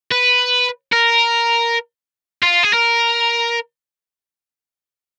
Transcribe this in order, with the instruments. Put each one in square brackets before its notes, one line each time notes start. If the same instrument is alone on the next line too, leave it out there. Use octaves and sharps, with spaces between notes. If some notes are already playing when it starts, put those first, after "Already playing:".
[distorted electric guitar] B4
A#4
F4
G#4
A#4